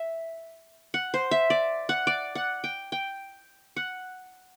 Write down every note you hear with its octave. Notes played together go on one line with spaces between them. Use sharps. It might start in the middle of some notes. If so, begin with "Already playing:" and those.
Already playing: E5
F#5
C5
E5
D5
F#5
D5
F#5
G5
G5
F#5